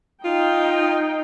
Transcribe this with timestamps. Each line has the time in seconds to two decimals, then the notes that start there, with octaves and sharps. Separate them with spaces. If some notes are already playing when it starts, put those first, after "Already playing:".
0.24 D#4 F4 G5